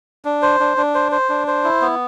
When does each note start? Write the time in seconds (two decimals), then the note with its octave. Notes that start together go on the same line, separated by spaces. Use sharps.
0.25 D4
0.42 C5
0.60 D4
0.77 D4
0.95 C5
1.12 C5
1.29 D4
1.47 C5
1.64 E4
1.82 B3